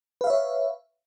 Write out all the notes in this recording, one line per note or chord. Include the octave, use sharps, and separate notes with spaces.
B4 C#5 E5 F5